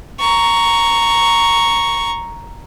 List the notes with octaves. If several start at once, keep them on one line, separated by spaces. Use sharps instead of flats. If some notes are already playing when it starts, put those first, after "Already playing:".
A#5 C#6